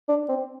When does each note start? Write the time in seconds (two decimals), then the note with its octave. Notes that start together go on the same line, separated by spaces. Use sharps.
0.09 D4
0.29 C4